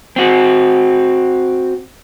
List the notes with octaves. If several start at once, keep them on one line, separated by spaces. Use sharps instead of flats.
C4 F#4